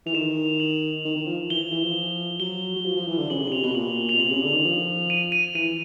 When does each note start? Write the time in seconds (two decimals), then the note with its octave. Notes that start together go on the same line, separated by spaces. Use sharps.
0.06 E3 F7
0.15 D#3 E7
0.60 F#7
1.05 D#3
1.16 D#3
1.27 F3
1.50 E3 G7
1.72 E3
1.84 F3
2.40 F#3 G7
2.76 F#3
2.85 F3
2.96 F3
3.08 E3
3.18 D3
3.30 C#3 F#7
3.41 C3
3.48 F#7
3.52 C3 F7
3.63 B2 G7
3.75 A#2 F#7
4.09 B2 F7
4.20 C3 F#7
4.31 C#3
4.43 D3
4.54 D#3
4.65 F3
5.10 D#7
5.32 D#7
5.55 E3 D#7